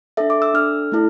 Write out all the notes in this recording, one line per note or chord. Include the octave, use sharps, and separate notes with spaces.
D4 A4 E5
D6
E6
D4 A4 F6
A3 E4 A4